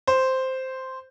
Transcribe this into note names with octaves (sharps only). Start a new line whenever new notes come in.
C5